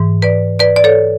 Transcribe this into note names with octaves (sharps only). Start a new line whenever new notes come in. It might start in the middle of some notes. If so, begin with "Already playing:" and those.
Already playing: G#2 E3
B4 D5
B4 D5
D5
A4 C#5